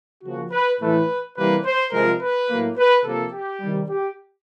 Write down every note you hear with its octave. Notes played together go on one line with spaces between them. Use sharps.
C#3 F3 A#3 F#4
B4
A2 E3 A3 B4
C3 E3 G3 A#3 B4
C5
C3 F3 G#3 A#4
B4
A2 F#3 A#3
B4
C3 F3 A#3 A4
G4
C3 D#3 G3
G4